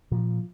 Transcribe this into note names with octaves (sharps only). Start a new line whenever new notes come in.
A#2 F3